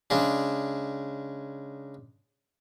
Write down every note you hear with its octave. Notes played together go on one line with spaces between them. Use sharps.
C#3 G#3 D4